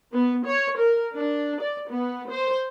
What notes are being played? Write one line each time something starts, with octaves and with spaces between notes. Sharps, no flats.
B3
C#5
A#4
D4
D5
B3
C5